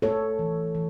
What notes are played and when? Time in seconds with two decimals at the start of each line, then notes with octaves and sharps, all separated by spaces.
0.02 A3 A4 C#5
0.39 E3
0.75 E3